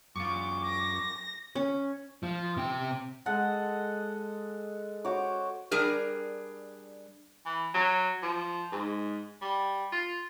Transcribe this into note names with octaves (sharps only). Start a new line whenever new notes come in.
F#2 F4 C#6 D6
A#6
C#4
F3
C3 G5
G#3 A4 D#5 F#5
F#4 C5 C#5 D6
G3 D4 G#4 A#4
E3
F#3
F3
G#2
G3
F4